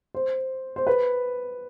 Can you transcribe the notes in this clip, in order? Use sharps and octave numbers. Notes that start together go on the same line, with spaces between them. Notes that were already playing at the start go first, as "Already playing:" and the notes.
C5
C5
B4